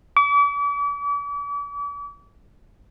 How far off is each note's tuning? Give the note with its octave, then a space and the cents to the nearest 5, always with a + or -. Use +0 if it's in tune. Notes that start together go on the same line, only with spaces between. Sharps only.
D6 -40